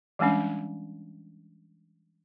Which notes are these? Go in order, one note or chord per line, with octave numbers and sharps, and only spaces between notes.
E3 G3 G#3 C#4 D4